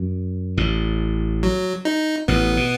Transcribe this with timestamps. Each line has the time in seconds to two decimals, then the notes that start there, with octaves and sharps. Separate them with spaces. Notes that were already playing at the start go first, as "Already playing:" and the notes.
Already playing: F#2
0.57 A1 A2
1.43 F#3
1.85 D#4
2.28 A1 A2 B3
2.57 B2